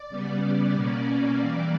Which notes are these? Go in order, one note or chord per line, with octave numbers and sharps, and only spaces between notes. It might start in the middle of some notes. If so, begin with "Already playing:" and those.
Already playing: D5
C#3 G3 B3
B2 A#3 C#4
E3 G3 A#3 D5